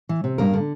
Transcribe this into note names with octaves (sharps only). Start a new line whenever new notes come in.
E3
C3
G2 A#3 A#4
D3